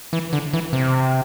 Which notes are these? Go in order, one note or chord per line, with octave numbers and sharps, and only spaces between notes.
E3
D3
E3
C3